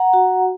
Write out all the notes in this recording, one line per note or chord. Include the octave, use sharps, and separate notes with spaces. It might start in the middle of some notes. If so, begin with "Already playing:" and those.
Already playing: F#5 A#5
F#4